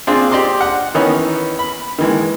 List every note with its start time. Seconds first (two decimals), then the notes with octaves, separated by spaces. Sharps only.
0.07 C4 D4 F4 G#4
0.31 G4 D5 D#5 C6 D6
0.61 F#5
0.95 D#3 E3 B3 C#4 D#4
1.59 B5
1.99 D#3 E3 G#3